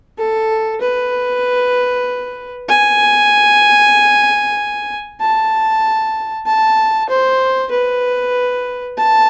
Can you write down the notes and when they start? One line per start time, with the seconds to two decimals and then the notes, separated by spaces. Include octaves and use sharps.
0.18 A4
0.81 B4
2.69 G#5
5.20 A5
6.46 A5
7.09 C5
7.72 B4
8.97 A5